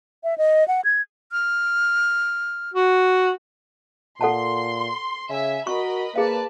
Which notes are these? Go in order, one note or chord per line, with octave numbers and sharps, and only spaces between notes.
E5
D#5
F#5
G#6
F6
F#4
A#2 A4 F#5 A5 C6
C#3 E5 G#5
F#4 A#4 D#5 B5 C#6
A#3 G#4 B4 D5 F5 A5